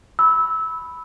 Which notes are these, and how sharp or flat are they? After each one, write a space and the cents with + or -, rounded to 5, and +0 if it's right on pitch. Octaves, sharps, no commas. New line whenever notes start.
B5 +0 E6 -20